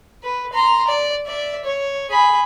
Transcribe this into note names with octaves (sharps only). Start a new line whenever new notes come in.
B4
A#5 C6
D5
D5 E5
C#5
G#4 B5